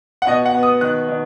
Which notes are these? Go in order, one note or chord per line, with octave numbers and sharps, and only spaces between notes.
F#5
B2 D#5
F#5
B3
D#6
D#3 F#6
D#3